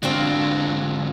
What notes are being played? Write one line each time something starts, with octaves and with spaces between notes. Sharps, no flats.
G#2 D3 C4 D4 F4 F#4